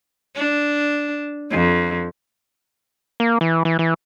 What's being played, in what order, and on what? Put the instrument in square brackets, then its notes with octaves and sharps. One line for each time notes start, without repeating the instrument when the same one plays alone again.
[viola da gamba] D4
F2
[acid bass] A#3
E3
E3
E3